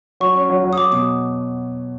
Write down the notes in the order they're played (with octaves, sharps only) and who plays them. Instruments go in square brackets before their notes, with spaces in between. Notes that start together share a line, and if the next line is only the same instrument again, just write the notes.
[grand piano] F#3 [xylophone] C#6
[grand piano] C#4
F#3
F#3
[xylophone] D#6
[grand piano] F#3 [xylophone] D6
[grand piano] B2 [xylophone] D#6